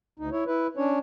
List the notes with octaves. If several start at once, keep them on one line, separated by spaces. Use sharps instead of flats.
D2 D#4
E4 C#5
E4 B4
C#4 D4 C#5